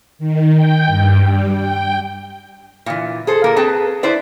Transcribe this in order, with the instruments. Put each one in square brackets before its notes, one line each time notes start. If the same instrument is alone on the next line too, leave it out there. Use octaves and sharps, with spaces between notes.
[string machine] D#3
G5
G2
G3
G5
[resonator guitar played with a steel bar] A#2 E3
G#4 A4 C5
A#2 A#3 A#4
C4 G#4 A4 B4 A5
E4 B4 C5 D5